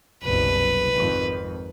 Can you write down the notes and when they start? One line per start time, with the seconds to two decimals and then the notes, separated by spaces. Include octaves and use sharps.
0.23 F#1 C2 B2 B4
0.95 G#1 F2 D#3